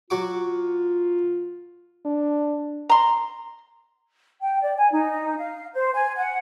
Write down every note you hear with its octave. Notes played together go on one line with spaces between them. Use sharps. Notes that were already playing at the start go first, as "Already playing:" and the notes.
F#3 F4 F#4 D6
D4
A#5 C6
G5
D5
G#5
D#4
F5
C5
G#5
F#5